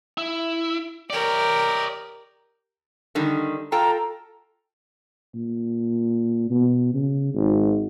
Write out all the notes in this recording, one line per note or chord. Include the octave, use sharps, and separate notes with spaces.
E4
G4 A#4 C#5 D5
D3 D#3 G3
F4 A4 G5 A#5
A#2
B2
C#3
G#1